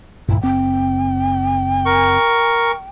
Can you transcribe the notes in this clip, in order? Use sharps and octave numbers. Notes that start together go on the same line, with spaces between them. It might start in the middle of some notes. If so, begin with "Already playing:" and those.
D2 G2 A#2 E4
F#1 C4 G5
A#4 C#6